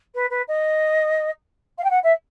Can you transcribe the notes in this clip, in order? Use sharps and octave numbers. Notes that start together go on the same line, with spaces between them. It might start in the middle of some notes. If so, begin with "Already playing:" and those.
B4
B4
D#5
F5
G5
F#5
E5